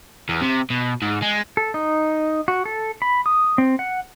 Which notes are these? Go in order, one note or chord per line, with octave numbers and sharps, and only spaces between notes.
E2
C3
B2
G#2
G#3
A4
D#4
F#4
A4
B5
D#6
C4
F#5